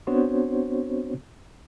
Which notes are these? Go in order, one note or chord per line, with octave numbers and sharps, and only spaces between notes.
B3 C4 D4 F#4 C5 C#5